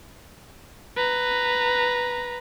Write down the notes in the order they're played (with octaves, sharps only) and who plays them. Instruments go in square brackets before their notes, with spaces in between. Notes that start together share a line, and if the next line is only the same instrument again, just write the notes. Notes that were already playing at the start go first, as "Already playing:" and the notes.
[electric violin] B4 A#5